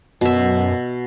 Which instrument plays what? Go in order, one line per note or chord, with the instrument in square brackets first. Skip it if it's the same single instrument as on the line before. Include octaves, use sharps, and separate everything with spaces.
[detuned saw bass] F#2 [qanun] B2 E5